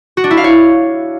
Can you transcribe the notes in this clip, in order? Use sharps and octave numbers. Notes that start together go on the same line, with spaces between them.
F#4
D4
E4
F5
C#5